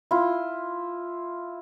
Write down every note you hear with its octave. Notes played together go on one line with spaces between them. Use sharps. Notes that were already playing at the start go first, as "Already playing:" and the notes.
E4 F4